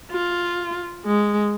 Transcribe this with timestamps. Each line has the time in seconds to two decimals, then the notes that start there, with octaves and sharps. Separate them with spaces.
0.11 F4
1.06 G#3